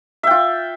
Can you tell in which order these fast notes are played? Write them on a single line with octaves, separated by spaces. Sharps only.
E5 G5 F4